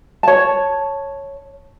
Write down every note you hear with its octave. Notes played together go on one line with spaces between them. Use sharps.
C#5 A5